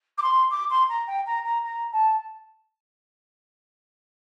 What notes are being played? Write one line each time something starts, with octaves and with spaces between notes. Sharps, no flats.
D6
C6
D6
C6
A#5
G5
A#5
A#5
A#5
A5